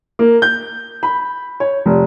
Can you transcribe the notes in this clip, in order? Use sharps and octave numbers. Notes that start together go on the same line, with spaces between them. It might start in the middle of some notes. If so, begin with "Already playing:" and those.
A#3
G6
B5
C#5
F1